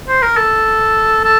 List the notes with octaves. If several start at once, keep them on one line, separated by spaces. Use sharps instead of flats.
C5
A#4
A4
A4